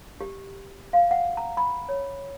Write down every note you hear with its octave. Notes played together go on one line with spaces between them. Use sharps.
G4
F5
F#5
A#5
B5
C#5